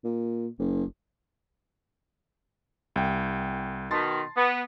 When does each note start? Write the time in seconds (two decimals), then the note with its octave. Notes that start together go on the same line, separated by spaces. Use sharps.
0.04 A#2
0.59 F#1
2.96 C2 G5
3.91 B2 D#3 A5 C6 A6
4.37 B3